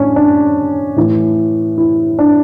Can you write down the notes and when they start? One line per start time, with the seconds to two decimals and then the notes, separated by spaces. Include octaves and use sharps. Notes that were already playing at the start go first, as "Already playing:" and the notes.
Already playing: A2 C#4 D4
0.16 D4
0.96 A2 E3
1.78 E4
2.19 D4